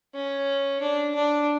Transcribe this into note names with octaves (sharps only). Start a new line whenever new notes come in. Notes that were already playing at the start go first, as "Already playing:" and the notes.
C#4
D4
D4